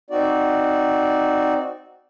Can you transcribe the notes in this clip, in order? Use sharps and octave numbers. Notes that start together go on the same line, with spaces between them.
C4 D#4 F#4 D5